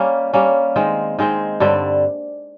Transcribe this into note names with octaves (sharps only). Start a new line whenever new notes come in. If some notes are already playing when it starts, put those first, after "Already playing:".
Already playing: G3 A#3 C#4
G3 A#3 C#4
D#3 G#3 C4
D#3 G#3 C4
G2 D3 G3 C4